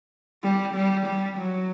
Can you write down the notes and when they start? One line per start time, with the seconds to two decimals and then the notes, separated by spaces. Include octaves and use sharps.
0.43 G3
0.75 G3
1.06 G3
1.38 F#3